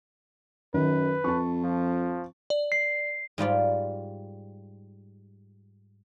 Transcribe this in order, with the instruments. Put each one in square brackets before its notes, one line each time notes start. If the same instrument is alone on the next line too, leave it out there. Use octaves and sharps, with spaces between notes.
[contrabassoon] F#2 [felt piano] D#3 [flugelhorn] B4
[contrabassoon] F2 [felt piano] A5 C#6
[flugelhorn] F3
[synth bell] D5
[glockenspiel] C7
[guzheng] G#2 G3 F4 D5